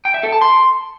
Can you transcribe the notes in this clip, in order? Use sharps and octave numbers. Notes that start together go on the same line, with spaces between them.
G5
E5
A4
A5
C6